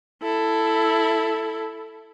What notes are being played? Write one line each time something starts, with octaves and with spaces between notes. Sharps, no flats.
E4 A4